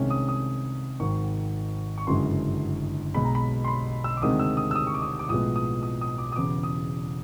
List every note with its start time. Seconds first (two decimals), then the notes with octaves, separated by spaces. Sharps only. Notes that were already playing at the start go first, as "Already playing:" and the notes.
Already playing: C2 C3 D#3 G#3 C#4
0.10 D#6
0.28 D#6
1.00 G#1 G#2 D#3 C#6
1.98 C#6
2.07 G1 F#2 C#3 E3 G#3 C6
3.14 B1 B2 G#3 B5
3.25 A#5
3.35 B5
3.64 C6
3.68 B5
4.04 E6
4.17 D6
4.22 D2 C3 D#3 G#3 C4 D#6
4.39 E6
4.57 D#6
4.71 E6
4.75 D#6
4.87 C#6
4.94 D6
5.02 D#6
5.19 D6
5.29 B1 A2 F3 G#3 B3 D#6
5.56 D#6
5.83 D#6
6.01 D#6
6.18 D6
6.32 D#6
6.36 E1 E2 C#3 D6
6.63 D#6